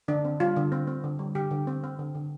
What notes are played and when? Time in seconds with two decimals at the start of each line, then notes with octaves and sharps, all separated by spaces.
0.08 D3 D4
0.25 C4
0.40 G3 F4
0.56 D3
0.72 C4
0.87 C4
1.04 D3
1.19 G3
1.35 D3 G4
1.51 D3
1.67 C4
1.84 C4
1.99 D3
2.15 D3